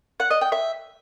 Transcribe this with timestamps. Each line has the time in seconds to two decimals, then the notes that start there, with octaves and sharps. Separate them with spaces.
0.20 F#5
0.30 D#5
0.41 G5
0.52 E5